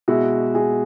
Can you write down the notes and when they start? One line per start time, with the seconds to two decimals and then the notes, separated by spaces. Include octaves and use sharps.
0.08 B2 G#3 E4 F#4
0.54 F#4 G#4